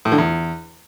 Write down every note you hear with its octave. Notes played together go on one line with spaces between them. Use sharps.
A2
D3
E2